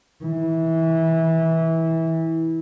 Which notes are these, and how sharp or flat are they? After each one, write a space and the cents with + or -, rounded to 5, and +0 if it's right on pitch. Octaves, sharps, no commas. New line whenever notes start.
E3 -20